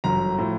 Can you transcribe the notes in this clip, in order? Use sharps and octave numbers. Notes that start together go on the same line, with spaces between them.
G1 F#2 D3 A#5
A2 F3